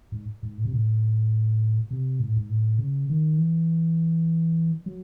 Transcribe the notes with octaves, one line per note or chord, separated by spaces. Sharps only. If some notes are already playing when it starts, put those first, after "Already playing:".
G#2
G#2
A2
C3
A2
C3
G#2
A2
G#2
A2
C#3
D#3
E3
F#3